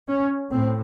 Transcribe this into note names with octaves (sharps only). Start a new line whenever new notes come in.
C#4
A2 C4